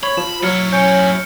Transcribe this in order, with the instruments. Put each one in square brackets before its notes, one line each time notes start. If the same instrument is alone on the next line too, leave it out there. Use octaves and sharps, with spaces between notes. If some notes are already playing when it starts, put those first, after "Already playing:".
[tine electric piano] C#5 [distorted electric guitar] B5
[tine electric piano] F3 [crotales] E7
[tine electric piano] F#3 [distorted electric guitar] E4 C#5 [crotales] F6 C#7
[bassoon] C#4 [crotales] G6 C#7 D7